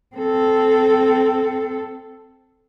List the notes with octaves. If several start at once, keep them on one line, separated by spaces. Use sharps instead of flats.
C4 A4